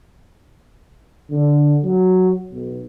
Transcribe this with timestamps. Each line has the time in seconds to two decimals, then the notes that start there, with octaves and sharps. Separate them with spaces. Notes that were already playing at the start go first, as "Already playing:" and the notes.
1.31 D3
1.84 F#3
2.53 B1